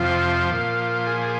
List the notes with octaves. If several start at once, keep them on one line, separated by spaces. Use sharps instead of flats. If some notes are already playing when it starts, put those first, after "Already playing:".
Already playing: F2 C3 F3 F4
A#2 F3
G#4